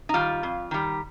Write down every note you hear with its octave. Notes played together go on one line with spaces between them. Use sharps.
D#4
D#3 G3 F4
F2
D#3 G3